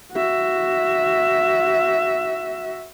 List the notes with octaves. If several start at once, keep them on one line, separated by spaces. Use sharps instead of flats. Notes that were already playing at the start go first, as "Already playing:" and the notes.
F#4 E5